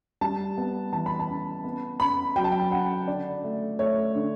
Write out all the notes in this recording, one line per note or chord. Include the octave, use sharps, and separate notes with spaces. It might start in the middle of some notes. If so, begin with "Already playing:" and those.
G3 A5
B3
E3 A5
B5
A5
C#3
B3
C#3 B5
F#3 G5
A5
G5
C#3 F#5
D3 D5
A3
A3 C#5
D3